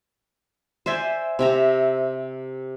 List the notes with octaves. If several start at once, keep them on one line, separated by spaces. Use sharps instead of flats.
C5 D5 E5 G#5
C3 E5 A#5